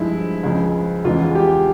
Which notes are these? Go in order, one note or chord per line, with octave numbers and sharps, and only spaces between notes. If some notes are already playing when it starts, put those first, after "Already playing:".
Already playing: G2 F3 G#3 E4
C#2 C#3 F3 G#3
E2 C#3 E3 G#3 F4
G4